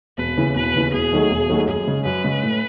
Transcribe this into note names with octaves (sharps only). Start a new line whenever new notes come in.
E1 B4
D#2 C#3 E3
E1 B4
D#2 C#3 E3
E1 G#4
D#2 D#3 F#3 A3
E1
D#2 D#3 F#3 A3
F#2 G#4
C#3 G#3
F#2 B4
C#3 G#3
A2